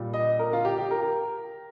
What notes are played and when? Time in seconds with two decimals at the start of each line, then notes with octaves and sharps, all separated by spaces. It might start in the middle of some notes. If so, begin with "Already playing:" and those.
Already playing: A#2 G3
0.14 D#5
0.39 A#4
0.53 F4
0.65 G4
0.78 G4
0.91 A#4